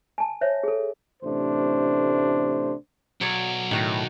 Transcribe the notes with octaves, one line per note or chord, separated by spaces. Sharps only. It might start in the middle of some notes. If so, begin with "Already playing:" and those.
G#5 A5
C5 C#5 E5
G#4 A4
A1 C3 A3 D4 C5
B1 F#3 C#5 D5
A2 D#3 F#4 A#5